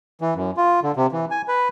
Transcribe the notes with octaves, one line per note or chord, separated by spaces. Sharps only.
E3
F#2
F4
D3
C3
E3
G#5
B4